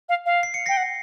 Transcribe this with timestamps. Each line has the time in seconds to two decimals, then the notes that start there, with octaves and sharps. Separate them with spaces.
0.09 F5
0.26 F5
0.43 C7
0.54 C#7
0.66 G5 A#6 C7
0.77 F#5